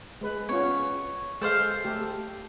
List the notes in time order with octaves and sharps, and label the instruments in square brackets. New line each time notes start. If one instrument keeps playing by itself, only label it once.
[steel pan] G#3 B4
[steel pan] B3 C#4 F4 [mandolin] C#5
[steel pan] G#3 [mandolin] A4 C5 F5
[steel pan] A3 G4